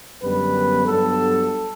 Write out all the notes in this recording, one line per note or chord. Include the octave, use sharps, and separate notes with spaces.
F#2 D3 G3 B3 B4
G2 F#3 B3 A4